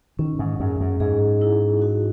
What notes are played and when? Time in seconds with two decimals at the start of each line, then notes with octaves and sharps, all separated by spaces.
0.19 D#3 C#4
0.39 G#2
0.60 F#2 G#4
0.80 F#2
1.00 G#2 G#4
1.41 E4
1.82 F#4